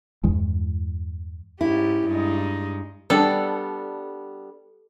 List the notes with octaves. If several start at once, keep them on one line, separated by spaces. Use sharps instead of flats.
E2 G2 E3 G#3
G#2 C#4 E4 G4
G2 G#3 D#4
G3 B3 D4 A4